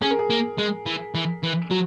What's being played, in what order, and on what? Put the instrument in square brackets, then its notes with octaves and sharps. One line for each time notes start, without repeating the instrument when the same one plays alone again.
[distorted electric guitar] C#4 [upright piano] G#4
[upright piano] A#4
G#4
[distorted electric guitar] A#3
G#3
E3
E3
E3
[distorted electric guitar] F#3 [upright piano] F#4